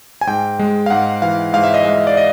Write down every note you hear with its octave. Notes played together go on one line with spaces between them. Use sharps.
G#5
G#2 G5
G#3
F5
G#2 F#5
E3 F5
G#2 F5
E5
D#5
G#3 E5
D5
D#5